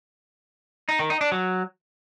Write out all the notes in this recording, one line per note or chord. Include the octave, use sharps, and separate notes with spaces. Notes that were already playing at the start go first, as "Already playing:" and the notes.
D#4
D#3
D#4
D4
F#3